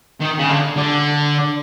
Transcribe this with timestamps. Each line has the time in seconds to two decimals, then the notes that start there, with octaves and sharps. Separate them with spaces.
0.21 D#3
0.39 C#3
0.49 D3
0.77 D3